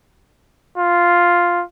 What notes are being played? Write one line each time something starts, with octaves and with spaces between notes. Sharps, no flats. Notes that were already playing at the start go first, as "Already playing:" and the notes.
F4